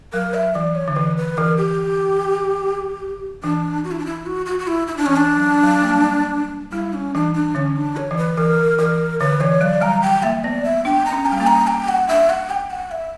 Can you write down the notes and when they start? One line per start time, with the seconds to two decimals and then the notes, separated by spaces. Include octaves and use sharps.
0.13 F#3 A#4
0.34 E5
0.55 E3 D5
0.75 C#5
0.88 D3
0.96 E3 B4
1.17 B4
1.37 E3 A#4
1.57 G4
3.43 E3 D4
3.84 F#4
3.91 E4
3.99 D4
4.06 E4
4.26 F#4
4.46 F#4
4.59 F#4
4.67 E4
4.87 E4
4.97 D4
5.06 E3 C#4
5.16 D4
5.36 F#3
5.63 F#3
5.82 A#3
5.90 G3
6.72 G3 E4
6.93 C#4
7.15 E3 D4
7.34 D4
7.55 D3 C#4
7.76 D4
7.97 C#5
8.11 E3
8.17 B4
8.37 E3 A#4
8.78 E3 A#4
9.20 D3 B4
9.41 E3 C#5
9.61 F#3 D5
9.81 G3 A#5
10.02 G5
10.23 A#3 E5
10.44 B3 D5
10.64 E5
10.85 D4 G5
11.06 A#5
11.12 C#4
11.26 G5
11.32 G3
11.40 A#3
11.47 A#5
11.67 G5
11.88 F#5
12.08 D4 E5
12.30 F#5
12.50 G5
12.71 F#5
12.91 E5